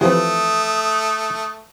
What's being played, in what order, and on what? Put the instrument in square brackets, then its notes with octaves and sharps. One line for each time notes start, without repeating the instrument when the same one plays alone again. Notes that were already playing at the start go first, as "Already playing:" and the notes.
[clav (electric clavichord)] E3 F3 C4 [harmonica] A3 [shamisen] G4 B4 [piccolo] D#6